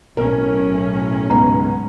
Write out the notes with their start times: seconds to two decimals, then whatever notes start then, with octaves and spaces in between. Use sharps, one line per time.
0.17 B1 A2 C#4 A#4
1.30 C#2 G#2 B3 A#5